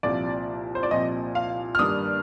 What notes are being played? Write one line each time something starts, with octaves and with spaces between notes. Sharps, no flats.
C2 A#2 F3 C4 D5
C5
D5
C2 A#2 F3 C4 D#5
F5
F6
G2 D#3 G3 A#3 D4 D#6